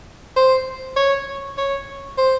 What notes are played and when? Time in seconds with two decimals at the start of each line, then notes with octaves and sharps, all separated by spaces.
0.36 C5
0.97 C#5
1.58 C#5
2.18 C5